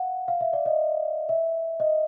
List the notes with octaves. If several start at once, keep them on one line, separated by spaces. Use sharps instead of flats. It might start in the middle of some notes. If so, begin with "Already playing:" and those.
Already playing: F5 F#5
F5
E5
D5
D#5
E5
D#5